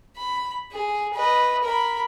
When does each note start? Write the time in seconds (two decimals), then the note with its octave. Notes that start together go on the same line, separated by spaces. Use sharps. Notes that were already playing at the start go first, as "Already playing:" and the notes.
0.17 B5
0.72 G#4
1.13 B4 D#5
1.63 A#4 B5